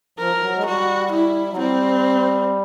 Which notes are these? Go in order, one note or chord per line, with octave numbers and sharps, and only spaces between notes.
F3 A#4
F3
F#3
G#3
G3 F#4
E4
F#3
G3 C4